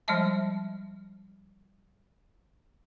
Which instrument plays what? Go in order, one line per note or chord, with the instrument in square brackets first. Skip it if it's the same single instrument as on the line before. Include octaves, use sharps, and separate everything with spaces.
[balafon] F3 G3 G#3 D#5 E5 A5